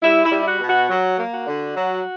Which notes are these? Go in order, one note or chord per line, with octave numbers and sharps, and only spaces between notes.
G3 E4
E4
G3
E4
F#4
B2
F#4
F#3
A#3
F#4
D3
F#3